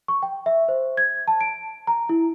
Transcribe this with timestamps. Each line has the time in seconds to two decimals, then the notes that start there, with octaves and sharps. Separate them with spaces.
0.08 C#6
0.23 G5
0.46 E5
0.69 C5
0.97 G#6
1.28 A5
1.41 D7
1.87 A#5
2.09 E4